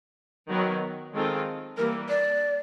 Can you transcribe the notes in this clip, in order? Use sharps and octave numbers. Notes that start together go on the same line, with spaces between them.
D#3 F#3 B3
D#3 G#3 C4 F4 A4
E3 G3 A#3 A#4
D5